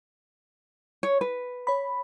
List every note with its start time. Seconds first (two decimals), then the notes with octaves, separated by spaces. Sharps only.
1.03 C#5
1.21 B4
1.67 C#5 B5